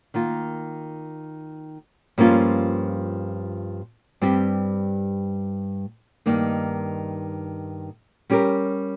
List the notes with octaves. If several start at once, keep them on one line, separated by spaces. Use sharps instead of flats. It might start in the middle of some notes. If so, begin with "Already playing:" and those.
D#3 A#3 F4
G2 F3 A#3 C#4 F4
G2 G3 C4 G4
G2 D#3 A#3 D#4
G3 C#4 G4 A#4